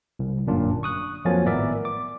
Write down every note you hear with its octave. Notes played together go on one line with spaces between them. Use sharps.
C2
G1 F#2 A#2 D4 F4
C#6 D#6 F#6
F2 F3 F#3 A#3 G#5 A6
G#1 A2 B3 A#4 D5 E5
D6